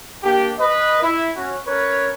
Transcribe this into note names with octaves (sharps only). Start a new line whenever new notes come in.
A#3 D4 G4
B4 D#5
E4
C#4 F#4
C#4 A#4 B4 C#5